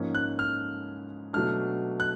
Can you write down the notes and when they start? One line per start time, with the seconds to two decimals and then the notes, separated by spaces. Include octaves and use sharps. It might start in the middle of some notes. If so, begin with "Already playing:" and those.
Already playing: G#2 F3 A#3 C#4
0.15 F#6
0.39 F6
1.33 B2 F#3 A3 D4 F6
2.00 F#6